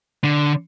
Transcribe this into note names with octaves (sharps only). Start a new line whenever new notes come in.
D3